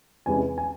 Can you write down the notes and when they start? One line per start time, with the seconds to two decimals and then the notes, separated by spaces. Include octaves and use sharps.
0.26 E2 C3 E3 G#3 C#4 G#5
0.58 G#5